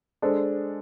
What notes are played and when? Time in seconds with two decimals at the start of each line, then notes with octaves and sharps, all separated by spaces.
0.22 G#3 D4 A4 C5